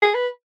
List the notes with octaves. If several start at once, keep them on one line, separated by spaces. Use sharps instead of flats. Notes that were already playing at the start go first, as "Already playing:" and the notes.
G#4
B4